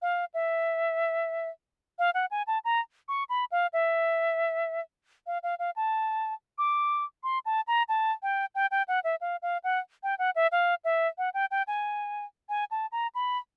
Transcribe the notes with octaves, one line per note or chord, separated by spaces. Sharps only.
F5
E5
F5
F#5
G#5
A5
A#5
C#6
B5
F5
E5
F5
F5
F5
A5
D6
C6
A5
A#5
A5
G5
G5
G5
F#5
E5
F5
F5
F#5
G5
F#5
E5
F5
E5
F#5
G5
G5
G#5
G#5
A5
A#5
B5